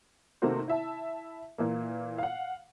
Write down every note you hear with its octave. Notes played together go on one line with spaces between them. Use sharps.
C3 D#3 A3 A#3 F#4 C5
E4 E5 A5
A#2 E3 A#3
F5 F#5